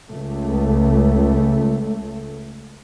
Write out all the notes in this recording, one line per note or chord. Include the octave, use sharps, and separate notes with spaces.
C#2 A3